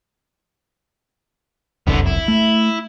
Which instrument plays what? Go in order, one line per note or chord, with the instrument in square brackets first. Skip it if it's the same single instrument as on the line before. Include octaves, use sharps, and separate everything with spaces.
[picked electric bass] F1 C2 F#2 [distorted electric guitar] D3 B3
[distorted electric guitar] E4
[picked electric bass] A3